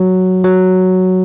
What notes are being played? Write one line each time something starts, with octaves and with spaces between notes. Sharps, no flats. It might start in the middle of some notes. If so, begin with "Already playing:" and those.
Already playing: F#3
F#3